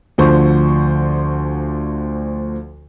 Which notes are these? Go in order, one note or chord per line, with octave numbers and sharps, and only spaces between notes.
D2 D3 F3 C5 C#6